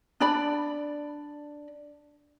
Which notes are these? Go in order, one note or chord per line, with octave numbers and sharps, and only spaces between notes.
D4 D5 B5